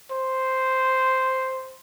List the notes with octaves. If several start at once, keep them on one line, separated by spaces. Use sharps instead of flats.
C5